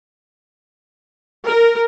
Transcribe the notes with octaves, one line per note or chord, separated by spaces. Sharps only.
A#4